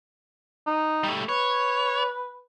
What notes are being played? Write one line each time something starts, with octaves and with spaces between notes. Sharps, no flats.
D#4
G3 A3
B4 C#5